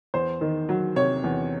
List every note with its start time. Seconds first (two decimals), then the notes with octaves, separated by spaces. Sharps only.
0.14 E2 C5
0.41 D#3
0.69 F#3
0.96 C3 C#5
1.24 E2